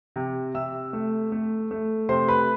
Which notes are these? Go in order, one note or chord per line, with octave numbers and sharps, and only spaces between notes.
C3
C3 E5 E6
A3
A3
A3
C3 C5 C6
B4 B5